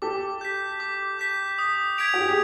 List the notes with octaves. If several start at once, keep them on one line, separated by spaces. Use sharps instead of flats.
G4 A4 D6
G6 B6
D6
G6 B6
D#6
G#6 B6 D7 F7
F#4
G4
G#4